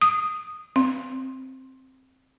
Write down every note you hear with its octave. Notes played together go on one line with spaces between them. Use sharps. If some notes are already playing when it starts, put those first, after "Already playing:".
D#6
C4